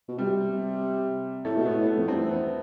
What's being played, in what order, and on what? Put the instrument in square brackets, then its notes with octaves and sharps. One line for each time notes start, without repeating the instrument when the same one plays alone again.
[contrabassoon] B2
[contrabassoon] C3 [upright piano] G3
[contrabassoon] A2 [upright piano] A3
[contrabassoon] B2
[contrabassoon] A2 [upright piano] B3
[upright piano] B3
[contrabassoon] F2
[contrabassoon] G2 [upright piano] C4
[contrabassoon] F2
E2
[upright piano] B3